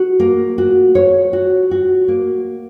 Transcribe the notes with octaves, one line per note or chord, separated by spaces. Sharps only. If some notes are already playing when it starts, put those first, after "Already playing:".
Already playing: F#4
A#3
F#4
C#5
F#4
F#4
A#3